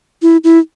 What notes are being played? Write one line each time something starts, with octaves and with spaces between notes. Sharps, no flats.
E4
E4